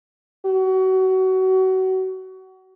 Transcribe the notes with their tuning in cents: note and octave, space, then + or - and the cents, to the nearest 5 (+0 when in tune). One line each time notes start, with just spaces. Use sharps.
F#4 +30